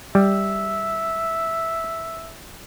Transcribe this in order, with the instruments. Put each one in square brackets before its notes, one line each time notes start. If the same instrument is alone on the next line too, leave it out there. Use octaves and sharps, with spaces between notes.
[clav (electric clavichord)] G3 [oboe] E5